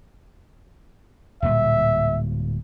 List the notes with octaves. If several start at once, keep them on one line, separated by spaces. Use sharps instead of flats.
D1 A#2 G3 E5